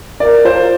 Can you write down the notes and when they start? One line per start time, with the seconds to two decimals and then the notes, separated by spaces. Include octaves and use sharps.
0.20 A#4 D5
0.45 F4 C5